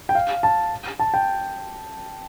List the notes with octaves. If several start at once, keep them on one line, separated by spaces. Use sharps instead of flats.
G5
F5
A5
A5
G5